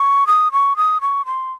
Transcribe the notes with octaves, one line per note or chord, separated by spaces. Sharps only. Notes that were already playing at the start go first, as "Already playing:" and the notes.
Already playing: C#6
D#6
C#6
D#6
C#6
C6